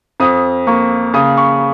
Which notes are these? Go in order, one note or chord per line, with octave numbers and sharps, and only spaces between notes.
F2 D#6
A#3 C#6
C#3 D#6
C#6